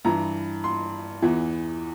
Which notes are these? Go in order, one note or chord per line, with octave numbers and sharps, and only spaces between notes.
G2 E3 A#5
C6
E2 E3